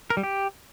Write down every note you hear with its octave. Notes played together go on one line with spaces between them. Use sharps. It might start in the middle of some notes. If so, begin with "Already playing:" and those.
A#4
G3
G4